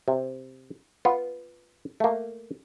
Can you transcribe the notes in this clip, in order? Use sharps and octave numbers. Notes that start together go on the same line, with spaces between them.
C3
B3 F4
A3 A#3